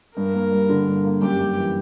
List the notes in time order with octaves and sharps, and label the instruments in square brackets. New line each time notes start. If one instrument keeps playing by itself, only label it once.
[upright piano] G2 [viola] A#4
[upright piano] A#3
G3
D3
G2
A#3
[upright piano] F#2 [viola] G4
[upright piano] F#2
E3